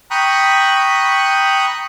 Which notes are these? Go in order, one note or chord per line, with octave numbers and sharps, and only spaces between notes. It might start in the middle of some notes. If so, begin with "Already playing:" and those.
G5 A#5 B5 C#6 D#6 F#6